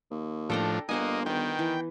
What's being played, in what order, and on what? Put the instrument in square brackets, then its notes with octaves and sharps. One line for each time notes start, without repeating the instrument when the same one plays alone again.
[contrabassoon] D#2
[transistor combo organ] A2 F3 [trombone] D4 [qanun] A4 G5 A#5
[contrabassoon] G1 [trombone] A#3 [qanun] C5 F#5 G#5 [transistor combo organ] D#5
[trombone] D#3 [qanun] B3 [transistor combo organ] G5
[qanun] E3